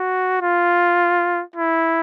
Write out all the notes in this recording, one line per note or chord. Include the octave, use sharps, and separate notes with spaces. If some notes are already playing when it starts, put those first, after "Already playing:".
Already playing: F#4
F4
E4